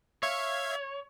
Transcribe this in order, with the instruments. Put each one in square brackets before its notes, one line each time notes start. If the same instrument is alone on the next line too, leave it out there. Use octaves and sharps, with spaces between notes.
[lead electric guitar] C#5 [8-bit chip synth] E5 F5 G#6